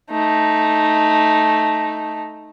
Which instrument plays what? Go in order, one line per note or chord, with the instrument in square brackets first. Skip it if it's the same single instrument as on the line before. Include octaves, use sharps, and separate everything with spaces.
[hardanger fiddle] A3 D#4